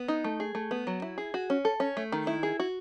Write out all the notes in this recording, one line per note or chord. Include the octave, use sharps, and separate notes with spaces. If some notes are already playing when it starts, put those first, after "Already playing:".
Already playing: B3
D#4
A3
G#4
A3
B3
F#3
E4
G#4
F#4
C#4
A4
C#4
A3
D#3
E4
G#4
F#4